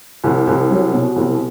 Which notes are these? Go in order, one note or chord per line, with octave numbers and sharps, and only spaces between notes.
C2
C2
F#3
B2
C2